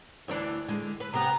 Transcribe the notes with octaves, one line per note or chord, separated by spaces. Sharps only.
D2 E3 D4
D3 G#3
B4
C3 B3 A#5